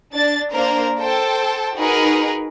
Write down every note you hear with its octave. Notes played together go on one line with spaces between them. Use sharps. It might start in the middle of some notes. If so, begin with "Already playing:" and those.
D4 A6
A#3 D4 A#4 C5
A4 C5 G5 A5
D#4 F#4 G#4 A#4 B4